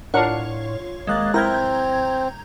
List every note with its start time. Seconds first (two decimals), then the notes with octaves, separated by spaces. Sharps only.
0.14 A2 D4 F4 A#4 C#5 F#5
1.07 G#1 G#3 A#3 D#5 F#6 A6
1.34 D1 C4 E4 A#4 A#5 G6 G#6